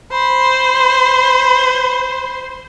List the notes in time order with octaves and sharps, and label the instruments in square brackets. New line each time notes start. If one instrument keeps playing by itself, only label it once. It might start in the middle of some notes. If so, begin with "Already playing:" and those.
[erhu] C5 [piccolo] B5